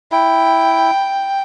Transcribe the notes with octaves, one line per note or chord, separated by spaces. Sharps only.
E4 G5